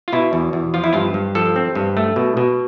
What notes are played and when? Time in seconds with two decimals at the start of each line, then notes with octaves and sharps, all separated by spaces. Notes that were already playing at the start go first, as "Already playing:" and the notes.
0.08 F4
0.13 B2 E4
0.33 E2
0.53 E2
0.74 F3 F4
0.84 E4
0.93 G2 F4
1.14 G2
1.35 F3 A4
1.56 C4
1.75 G2
1.97 A3
2.16 B2
2.37 B2